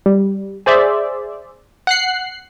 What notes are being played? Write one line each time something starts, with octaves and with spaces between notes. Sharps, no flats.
G3
G#4 C5 D5 E5
F#5 F#6 C7